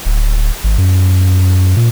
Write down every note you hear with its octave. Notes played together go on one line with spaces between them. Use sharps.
D1
G#1
F#2
A#2